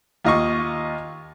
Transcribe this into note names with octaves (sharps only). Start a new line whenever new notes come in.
D#2 F4 D#5 F5 C#6